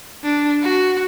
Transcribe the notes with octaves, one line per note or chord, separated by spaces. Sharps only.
D4
F#4